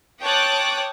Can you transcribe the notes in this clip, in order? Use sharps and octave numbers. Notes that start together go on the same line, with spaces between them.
C#5 G5 A5 D6 D#6 F#6